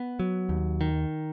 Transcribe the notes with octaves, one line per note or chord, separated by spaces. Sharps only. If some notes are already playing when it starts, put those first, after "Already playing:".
Already playing: B3
F#3
D#2
D#3